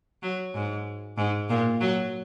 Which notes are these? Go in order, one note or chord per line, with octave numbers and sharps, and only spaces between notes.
F#3
G#2
G#2
A#2
F#3